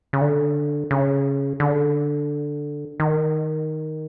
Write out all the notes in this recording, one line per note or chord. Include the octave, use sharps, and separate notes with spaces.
C#3
D3
C#3
D3
D#3